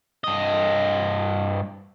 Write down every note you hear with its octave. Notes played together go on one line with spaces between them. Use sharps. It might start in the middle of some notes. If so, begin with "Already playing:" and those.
G2 D#5